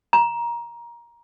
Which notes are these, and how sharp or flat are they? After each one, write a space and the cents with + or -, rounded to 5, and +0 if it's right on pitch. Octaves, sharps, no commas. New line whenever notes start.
A#5 +15